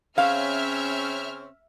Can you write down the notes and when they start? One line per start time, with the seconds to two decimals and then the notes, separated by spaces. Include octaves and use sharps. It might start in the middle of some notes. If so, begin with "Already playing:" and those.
0.18 C#3 C4 C#4 E5 F5 F6